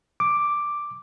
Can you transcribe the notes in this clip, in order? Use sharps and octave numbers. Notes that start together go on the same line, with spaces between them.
D6